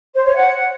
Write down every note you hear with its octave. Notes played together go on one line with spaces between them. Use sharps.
C5
C#5
F#5